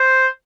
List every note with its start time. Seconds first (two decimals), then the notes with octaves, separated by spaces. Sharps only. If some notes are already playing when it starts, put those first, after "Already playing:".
Already playing: C5